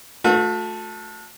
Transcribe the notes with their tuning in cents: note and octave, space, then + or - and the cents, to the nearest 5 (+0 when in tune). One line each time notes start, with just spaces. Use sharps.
A3 +0 F#4 -45